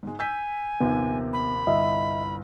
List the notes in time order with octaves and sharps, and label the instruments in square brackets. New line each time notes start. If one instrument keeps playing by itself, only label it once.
[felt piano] G#2 G#3
[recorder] G#5 [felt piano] E6 G6 B6
[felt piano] A#1 D#2 C3 [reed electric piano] B3
[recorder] B5
[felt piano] G1 C2 [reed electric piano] D#5 E5